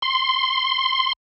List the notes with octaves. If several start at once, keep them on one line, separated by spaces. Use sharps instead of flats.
C6